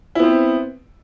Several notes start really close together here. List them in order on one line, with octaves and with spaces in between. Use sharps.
E4 B3 C4